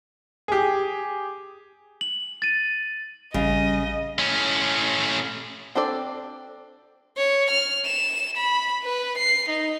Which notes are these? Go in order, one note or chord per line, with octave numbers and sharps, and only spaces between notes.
G4 G#4
F#7
A6 D#7
A1 C#3 G3 D#5
A2 C#4
C4 D4 A4 D5
C#5
F6
E7
B5
B4
C7
D#4